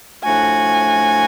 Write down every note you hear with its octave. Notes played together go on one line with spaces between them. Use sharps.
A2 F3 A3 D4 F#4 G#5